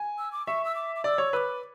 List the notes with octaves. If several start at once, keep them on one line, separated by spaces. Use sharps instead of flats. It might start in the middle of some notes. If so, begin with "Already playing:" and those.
Already playing: G#5
E6
D6
E5 C#6
E6
D6
D6
D5 E6
C#5
B4 D6 E6